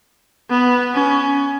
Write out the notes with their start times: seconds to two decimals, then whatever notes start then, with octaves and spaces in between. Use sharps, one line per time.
0.50 B3
0.94 C#4